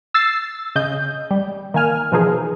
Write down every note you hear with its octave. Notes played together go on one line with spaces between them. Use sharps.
E6 A6 C7
C#3 D#5 G6
G3
D#3 A#3 G#5 F6
B2 E3 F3 D#4 G#4